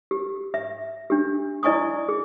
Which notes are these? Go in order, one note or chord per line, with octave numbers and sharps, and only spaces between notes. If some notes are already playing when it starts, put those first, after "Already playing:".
G4
E5
D4 G4
E4 D5 D#5 G#5 C#6 D#6
G#4